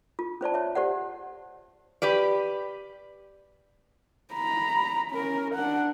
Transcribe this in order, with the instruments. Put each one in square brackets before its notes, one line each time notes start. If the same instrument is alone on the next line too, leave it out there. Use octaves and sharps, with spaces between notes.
[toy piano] F4
C#4 C5 D5 A5
C#5 E5
G4 C5 D5 F#5
[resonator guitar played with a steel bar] G4 B4 D5
[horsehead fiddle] A#5 B5
C#4 A#4
D4 F#5